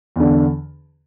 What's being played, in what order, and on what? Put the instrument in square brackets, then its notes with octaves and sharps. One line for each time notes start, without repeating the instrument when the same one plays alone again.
[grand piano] E2 D3